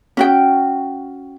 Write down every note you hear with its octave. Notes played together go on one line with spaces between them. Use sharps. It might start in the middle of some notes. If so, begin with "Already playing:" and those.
C#4 F#4 G5